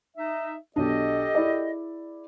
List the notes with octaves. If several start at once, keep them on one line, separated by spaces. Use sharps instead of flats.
D#4 E5
B1 D4 G4 A4 D#5
E4 G#4 D5